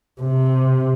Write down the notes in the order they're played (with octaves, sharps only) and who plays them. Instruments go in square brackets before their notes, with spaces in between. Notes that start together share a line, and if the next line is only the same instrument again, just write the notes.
[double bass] C3